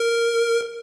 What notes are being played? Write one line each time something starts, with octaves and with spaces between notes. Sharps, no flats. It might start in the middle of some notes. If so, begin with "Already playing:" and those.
Already playing: A#4